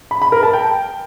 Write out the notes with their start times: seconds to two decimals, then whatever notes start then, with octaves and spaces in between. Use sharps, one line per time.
0.11 B5
0.22 B5
0.32 A#4
0.43 A5
0.53 G5